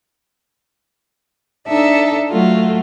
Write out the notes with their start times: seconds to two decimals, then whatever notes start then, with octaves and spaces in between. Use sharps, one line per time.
1.67 D4 D#4 A4 E5
2.30 F#3 A3 F4 F#4